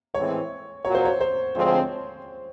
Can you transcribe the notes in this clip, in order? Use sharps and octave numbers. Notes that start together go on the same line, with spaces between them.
A2 E3 G#3 C4 C#5
A#2 F#3 A#3 C#5
C5
C#5
C5
D2 D3 F3 G#3 C4